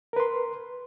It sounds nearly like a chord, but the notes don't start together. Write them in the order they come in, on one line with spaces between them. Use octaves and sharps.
A#4 B4 C6